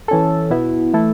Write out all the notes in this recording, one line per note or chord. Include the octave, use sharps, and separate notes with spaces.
E3 C#4 A4
B2 B3 E4
E3 A3 E4 A4